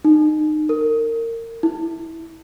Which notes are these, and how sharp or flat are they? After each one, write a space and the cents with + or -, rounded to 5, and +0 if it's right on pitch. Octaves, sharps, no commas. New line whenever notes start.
D#4 -25
A#4 -25
E4 -15